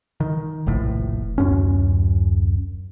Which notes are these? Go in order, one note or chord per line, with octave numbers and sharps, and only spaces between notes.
D#3
F1 A#1 A2
D1 F#2 C#4